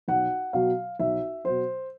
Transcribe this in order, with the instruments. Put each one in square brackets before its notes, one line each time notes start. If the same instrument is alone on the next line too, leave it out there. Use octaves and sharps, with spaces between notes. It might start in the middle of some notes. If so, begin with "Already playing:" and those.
[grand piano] B1 F#5
B2 F#3 F5
B1 E5
B2 F#3 C5